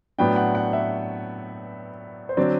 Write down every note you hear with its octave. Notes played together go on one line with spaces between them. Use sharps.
A2 F#3 B3 D4 G5
F#5
F#5
E5
C5
D3 F#3 C4 D5